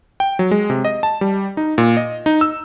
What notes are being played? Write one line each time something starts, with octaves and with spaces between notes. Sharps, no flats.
G5
F#3
G#3
C3
D#5
A5
G3
D#4
A#2
D#5
D#4
E6